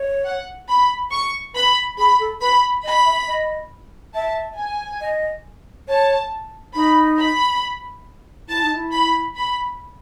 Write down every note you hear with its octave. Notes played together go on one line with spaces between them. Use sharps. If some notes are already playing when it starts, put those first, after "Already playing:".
Already playing: C#5
F#5
B5
C#6
B4 B5
G#4 B5
A4
B4 B5
D#5 B5
E5
D#5
E5 A5
G#5
D#5
C#5 A5
D#4 B5
B5
E4 A5
D#4
E4
B5
B5